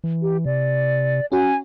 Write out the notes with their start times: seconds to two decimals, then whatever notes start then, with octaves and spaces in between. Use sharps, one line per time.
0.04 E3
0.22 G4
0.46 C3 D5
1.32 C#4 F#4 G#5